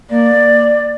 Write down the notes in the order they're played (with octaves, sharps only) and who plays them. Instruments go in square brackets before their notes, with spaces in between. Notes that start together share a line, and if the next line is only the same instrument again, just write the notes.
[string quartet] A#3 [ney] D5